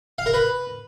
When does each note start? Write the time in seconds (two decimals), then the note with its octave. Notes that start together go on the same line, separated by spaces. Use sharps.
0.18 F5
0.26 A#4
0.34 B4